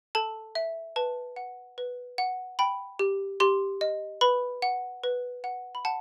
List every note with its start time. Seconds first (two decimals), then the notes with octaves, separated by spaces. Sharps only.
0.15 A4 A5
0.55 E5
0.96 B4 A5
1.36 F#5
1.78 B4
2.18 F#5
2.59 G5 B5
2.99 G4
3.40 G4 C6
3.81 D#5
4.21 B4 B5
4.62 F#5
5.04 B4
5.44 F#5
5.75 B5
5.85 F#5 A5